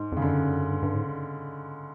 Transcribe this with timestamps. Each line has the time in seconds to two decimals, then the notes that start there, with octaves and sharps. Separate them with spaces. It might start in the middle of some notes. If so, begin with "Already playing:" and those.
Already playing: G#2
0.12 F2 C#3
0.22 F#2 D3
0.71 G2
0.83 G2
0.95 G#2